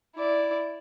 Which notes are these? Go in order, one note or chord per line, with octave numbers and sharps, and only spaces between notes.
E4 D5